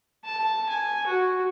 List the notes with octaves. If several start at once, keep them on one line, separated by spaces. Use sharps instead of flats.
A5
G#5
F#4